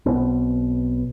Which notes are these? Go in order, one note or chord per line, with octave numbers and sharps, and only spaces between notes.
B1 B2 C4